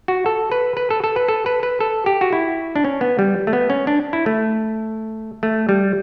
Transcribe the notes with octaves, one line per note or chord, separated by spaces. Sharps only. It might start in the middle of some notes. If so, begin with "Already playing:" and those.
F#4
A4
B4
B4
A4
A4
B4
A4
B4
B4
A4
G4
F#4
E4
D4
C#4
B3
G3
A3
B3
C#4
D4
E4
A3
A3
G3